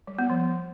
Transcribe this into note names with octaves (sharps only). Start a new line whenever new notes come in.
G3
B3
F3